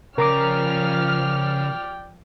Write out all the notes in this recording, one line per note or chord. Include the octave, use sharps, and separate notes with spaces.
C#3 F3 A#4 D5 G5 A#5 D6 F6